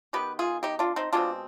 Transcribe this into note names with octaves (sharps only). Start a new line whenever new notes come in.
D#3 B3 G4 B4
F4 G#4
D#4 G4
D4 F4
C4 D#4
B2 G#3 C4 D4 F4